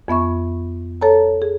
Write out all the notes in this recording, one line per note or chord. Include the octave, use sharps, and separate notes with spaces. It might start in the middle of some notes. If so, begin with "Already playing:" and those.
F2 B3 E5 C#6
A4 C#5 A5 A#5
G#4